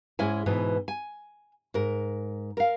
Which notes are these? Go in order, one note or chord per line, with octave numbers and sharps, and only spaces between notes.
G#2 G#3 C#4 E4 G#5
G#2 B2 E3 B3
G#5
G#2 A#4
A#4 F5